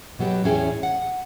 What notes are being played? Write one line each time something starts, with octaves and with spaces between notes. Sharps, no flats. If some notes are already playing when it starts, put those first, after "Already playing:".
B2 F#3 B3 G4
E2 A2 C#4 E4 G#4 G5
F#5